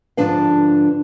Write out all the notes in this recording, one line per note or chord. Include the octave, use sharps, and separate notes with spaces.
G#2 D3 F3 D4 B4 F5